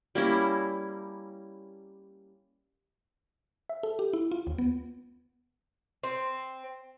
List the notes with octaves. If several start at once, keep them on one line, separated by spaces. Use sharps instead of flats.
G3 A#3 C#4 E4
E5
A4
G4
E4
F4
D#2
B3
C4